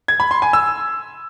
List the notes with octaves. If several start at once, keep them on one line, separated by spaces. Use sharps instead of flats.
G#6
B5
C6
G#5
E6